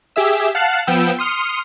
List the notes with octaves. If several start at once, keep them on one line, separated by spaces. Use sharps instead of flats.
G4 G#4 E5 E6
F5 F#5 A5 F6 F#6 C7
F3 B3 G5 E6
C6 D#6 F6 C#7